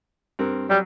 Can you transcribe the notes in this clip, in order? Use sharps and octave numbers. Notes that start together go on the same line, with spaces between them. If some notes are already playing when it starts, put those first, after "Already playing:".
G2 C4 A#4
F#3 G3